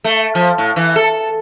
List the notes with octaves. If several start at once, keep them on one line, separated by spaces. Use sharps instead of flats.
A3
F3
A2
E3
A4